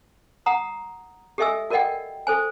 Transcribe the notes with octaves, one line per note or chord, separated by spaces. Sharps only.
F#5 A#5 D#6
G4 A4 D#5 E5 G#5 E6
F#4 A#4 D5 D#5 F#5 G5
A4 C5 G#5